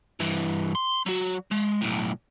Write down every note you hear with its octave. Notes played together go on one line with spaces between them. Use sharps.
G2 E3
C6
F#3 F#4
G#3
B1 A2